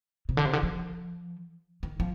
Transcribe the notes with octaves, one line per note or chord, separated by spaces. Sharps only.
C3
D3
C3
D3
F3
D#3
F3